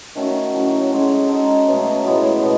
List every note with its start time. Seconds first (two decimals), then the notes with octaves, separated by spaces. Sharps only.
0.15 D#3 A3 C#4 F#4
0.53 A2 F#3 A3 C#4
0.91 G#3 C#4 F#4
1.29 G#3 D#4 A4
1.67 B2 F#3 A3 C#4
2.05 A2 G#3 B3 F#4
2.42 B2